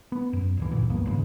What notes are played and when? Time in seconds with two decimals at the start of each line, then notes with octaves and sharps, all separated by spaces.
0.12 B3
0.33 F#2
0.57 D1 F#2 E3
0.72 D2 G2 A#2 E3
0.90 C2 F#2 A#3 B3
1.06 G1 D#2 G#2 C#3